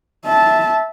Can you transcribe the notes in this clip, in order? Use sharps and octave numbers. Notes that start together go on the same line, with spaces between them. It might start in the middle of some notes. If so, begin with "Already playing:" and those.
E5 A5